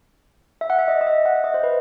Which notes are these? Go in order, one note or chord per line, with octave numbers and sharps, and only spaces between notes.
E5
F#5
E5
D#5
D#5
E5
F#5
E5
D#5
C5
B4